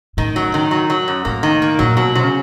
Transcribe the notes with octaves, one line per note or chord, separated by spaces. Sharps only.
A2 D#3
F#3
D#3
F#3
F#3
F#2
A2 A#3
D#3
A#3
A#2 F#3
B2 F#3
C3 F#3
C#3